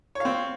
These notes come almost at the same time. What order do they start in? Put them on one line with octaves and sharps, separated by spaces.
C#5 F5 C4